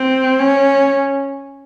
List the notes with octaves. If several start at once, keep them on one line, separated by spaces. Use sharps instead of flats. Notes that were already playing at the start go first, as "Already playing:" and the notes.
Already playing: C4
C#4